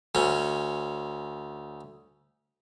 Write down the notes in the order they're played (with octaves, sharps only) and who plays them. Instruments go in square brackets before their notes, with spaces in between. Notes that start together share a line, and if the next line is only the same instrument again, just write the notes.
[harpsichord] D2 C#4